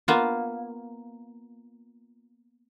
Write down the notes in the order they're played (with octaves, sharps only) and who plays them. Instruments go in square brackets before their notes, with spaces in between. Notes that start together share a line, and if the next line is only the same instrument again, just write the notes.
[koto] A#3 B3 F4